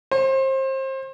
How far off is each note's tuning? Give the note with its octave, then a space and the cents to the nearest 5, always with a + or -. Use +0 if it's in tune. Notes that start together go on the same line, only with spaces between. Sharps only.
C5 +30